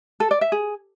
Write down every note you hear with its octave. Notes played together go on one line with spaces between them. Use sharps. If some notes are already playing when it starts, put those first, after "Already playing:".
A4
D5
E5
G#4